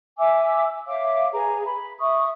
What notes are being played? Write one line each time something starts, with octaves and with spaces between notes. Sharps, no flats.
E5 G#5 D6 E6
C#5 E5 F5 D6
G#4 B4 A#5
B5
E5 C#6 D#6